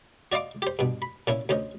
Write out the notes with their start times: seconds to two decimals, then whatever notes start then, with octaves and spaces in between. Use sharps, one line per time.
0.32 F#4 D5 D#5 F5 C6 D6
0.62 G4 C5
0.79 G2 B2
1.02 B5
1.27 A#2 C#4 E4
1.49 D2 C#4 C5 D#5